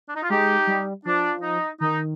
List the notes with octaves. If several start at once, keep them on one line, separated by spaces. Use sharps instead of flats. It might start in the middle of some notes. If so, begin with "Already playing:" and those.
D4
D#4
F4
G#3 D#4 G4
G3
F3 D4
D#4
D#3 D#4